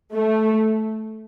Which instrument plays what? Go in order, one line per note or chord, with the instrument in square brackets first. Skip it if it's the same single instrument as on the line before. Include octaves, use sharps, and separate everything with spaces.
[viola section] A3